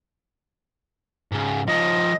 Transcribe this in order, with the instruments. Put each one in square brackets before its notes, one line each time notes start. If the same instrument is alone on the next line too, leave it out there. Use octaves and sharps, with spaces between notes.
[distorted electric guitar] G#2 C#3
[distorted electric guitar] F3 D#4 [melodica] D#5